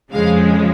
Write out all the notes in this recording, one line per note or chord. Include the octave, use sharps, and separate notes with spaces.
F2 C#3 F3 G#3 F5